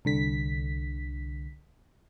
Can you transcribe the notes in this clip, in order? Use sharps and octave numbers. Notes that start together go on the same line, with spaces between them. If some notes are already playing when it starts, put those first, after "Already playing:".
C2 D3 B6